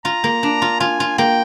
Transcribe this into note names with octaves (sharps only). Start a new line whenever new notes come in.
F4 A#5
A#3
D4
F4
F4 G#5
F4
A#3 G5